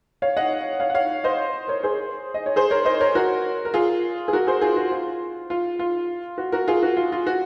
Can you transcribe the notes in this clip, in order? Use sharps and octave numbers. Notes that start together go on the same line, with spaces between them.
C#5 F5
D#5 F#5
C#5 F5
F#5
C#5 F5
C5 D#5
A#4 C#5
G#4 C5
D#5
C#5
G#4 C5
A#4 C#5
C5 D#5
A#4 C#5
F#4 A#4
A#4
F4 G#4
G#4
F#4 A#4
G#4 C5
F4 G#4
F#4
F4
F4
F4
F#4
F#4 A#4
F4 G#4
F#4
F4
F4
F#4